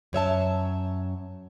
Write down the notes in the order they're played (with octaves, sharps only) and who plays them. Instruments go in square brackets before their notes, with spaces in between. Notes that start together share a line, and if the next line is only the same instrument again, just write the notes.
[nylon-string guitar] F#2 C#5 E5 A5